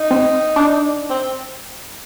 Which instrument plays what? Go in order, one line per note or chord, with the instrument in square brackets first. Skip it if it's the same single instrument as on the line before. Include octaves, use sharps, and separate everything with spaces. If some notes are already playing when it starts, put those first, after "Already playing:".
Already playing: [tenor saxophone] D#4
[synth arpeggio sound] C4
D4
[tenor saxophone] C4